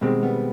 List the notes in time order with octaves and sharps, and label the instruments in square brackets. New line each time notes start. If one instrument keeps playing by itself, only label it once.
[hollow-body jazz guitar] B2 G#3 C4 [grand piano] D#3 G3
[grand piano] G3 B3